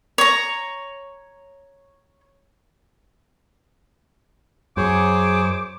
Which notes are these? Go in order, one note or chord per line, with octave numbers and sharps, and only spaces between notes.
C#5 A#5
F#2 G#4 C5 C#5 D6